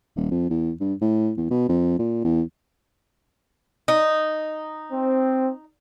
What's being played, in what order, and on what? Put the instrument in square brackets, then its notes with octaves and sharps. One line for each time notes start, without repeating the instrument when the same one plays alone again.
[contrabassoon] D#1
F2
E2
G2
A2
E2
B2
F2
A#2
E2
[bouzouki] D#4
[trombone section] C4